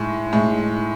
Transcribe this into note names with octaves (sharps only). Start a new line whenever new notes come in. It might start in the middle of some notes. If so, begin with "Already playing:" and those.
Already playing: A2 G#3
A2 G#3